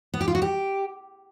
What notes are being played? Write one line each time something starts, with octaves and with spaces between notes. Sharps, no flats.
B3
G4
F4
F#4
G4